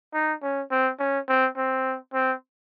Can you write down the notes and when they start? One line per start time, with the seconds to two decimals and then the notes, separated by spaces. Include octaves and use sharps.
0.14 D#4
0.42 C#4
0.71 C4
0.99 C#4
1.28 C4
1.57 C4
2.14 C4